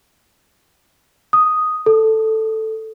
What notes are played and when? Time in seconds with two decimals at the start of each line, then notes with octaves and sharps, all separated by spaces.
1.33 D#6
1.86 A4